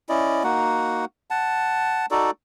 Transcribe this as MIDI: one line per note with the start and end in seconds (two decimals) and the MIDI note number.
0.09 0.43 61
0.09 0.43 64
0.09 0.43 74
0.09 0.43 75
0.44 1.05 58
0.44 1.05 63
0.44 1.05 66
0.44 1.05 78
1.30 2.06 78
1.30 2.06 81
2.11 2.31 63
2.11 2.31 66
2.11 2.31 69
2.11 2.31 74